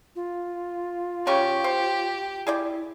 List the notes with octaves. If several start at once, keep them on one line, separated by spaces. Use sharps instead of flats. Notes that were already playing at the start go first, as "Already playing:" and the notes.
F4
C#3 C#4 G4 C#6
C5
E4 G#4 D5 G5